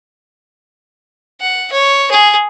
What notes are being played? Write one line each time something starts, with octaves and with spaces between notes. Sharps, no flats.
F#5
C#5
G#4